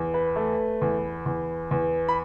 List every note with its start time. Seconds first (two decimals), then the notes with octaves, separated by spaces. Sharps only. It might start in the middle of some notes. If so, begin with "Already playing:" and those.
Already playing: E2
0.14 B4
0.36 A3
0.81 E2
1.26 E2
1.71 E2
2.09 B5